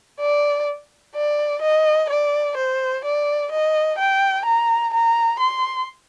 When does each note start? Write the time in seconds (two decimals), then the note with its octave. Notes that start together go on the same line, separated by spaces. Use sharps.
0.21 D5
1.16 D5
1.62 D#5
2.10 D5
2.57 C5
3.05 D5
3.52 D#5
3.99 G5
4.46 A#5
4.94 A#5
5.40 C6